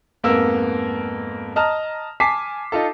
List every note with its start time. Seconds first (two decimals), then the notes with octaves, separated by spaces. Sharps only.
0.23 F2 G#2 A#3 B3 A#4 E6
1.56 D#5 A5 A#5 F6
2.20 G#5 A5 D6 B6 C7
2.72 D#4 F4 A4